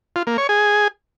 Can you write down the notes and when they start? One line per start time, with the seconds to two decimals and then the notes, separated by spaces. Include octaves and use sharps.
0.16 F4
0.27 A#3
0.38 C#5
0.49 G#4